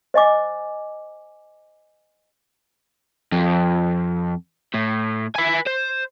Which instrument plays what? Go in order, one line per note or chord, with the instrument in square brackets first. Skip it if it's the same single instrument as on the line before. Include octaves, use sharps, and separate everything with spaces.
[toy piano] C5 D#5 G#5 D6
[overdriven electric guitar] F2
A2
B4 G#5
C5